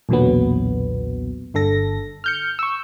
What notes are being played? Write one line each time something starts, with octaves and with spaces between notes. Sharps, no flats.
B1 E2 A#2 D3 F#3 B3
G1 D3 A4 A#6
F6 G6 C#7
C#6 E6